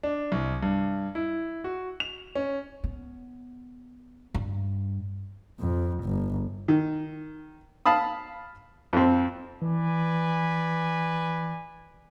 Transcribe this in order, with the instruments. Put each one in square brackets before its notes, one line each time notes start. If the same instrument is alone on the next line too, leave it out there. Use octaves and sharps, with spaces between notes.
[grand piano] D4
C2
G2
E4
F#4
F7
C#4
[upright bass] B3
G2
[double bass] F2
G1
[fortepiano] D#3
F5 A5 B5 D#6
F2 C4
[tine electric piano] E3 [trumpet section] B4 D5 G#5